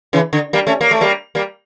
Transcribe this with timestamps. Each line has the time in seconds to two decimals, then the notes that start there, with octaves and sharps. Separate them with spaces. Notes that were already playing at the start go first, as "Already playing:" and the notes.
0.13 C#3 E3
0.33 D3
0.53 G3 A#3
0.67 A3 C#4
0.81 A#3
0.91 A3
1.01 G3 A#3
1.35 G3 A#3